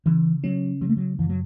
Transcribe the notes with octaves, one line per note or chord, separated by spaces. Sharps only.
C#3 E3
F#3 C#4
C#3 F#3
A3
F#3
F#2 E3
F#3